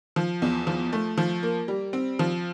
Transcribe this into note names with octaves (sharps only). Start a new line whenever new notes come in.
F3
E2
F3
A3
F3
A#3
G3
C4
F3